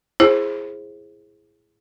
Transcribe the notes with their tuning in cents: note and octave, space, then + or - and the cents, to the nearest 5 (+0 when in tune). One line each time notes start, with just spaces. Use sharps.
E4 +15 G#4 +0 C5 +25